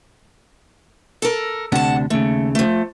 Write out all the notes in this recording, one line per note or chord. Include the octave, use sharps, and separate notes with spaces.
A4 A#4
D2 C3 D4 F#5 A5
D#2 C#3 A3
F3 A3